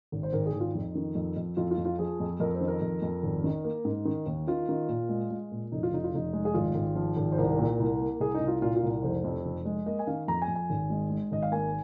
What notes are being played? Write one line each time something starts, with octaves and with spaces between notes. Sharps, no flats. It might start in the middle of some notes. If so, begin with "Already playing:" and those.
G#1
C5
G#1 A#4
G#4
G#1
F4
F2 D#4
D#3
F2
F2
F2 F4
F4
F2
F4
F3 G#4
F2
F2 A#4
C5
D#3
A#4
F2
F2
G#1
D#3
A#3
G#2
D#3
D#2
D#3 F4
D#3
A#2
G#3
G#3
A#2
F1 D#4
F4
F1 D#4
F4
F1 D#4
G#3
G#4
G#1 F4
G#1
F3
G#1
C5
C2 A#4
A#2
C2
A#3
C2 G#4
D#4
C2
F4
A#2 F4
F4
C2
F1 C5
F2
F1
G#3
A#3 D#5
G#5
D#3 F5
F2 A#5
G#5
F2
G#5
G#1
G#3
G#3
G#1 D#5
F5
A#3 G#5